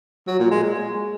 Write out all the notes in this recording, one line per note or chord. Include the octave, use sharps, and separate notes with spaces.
F#3
A#2
G#3
G#3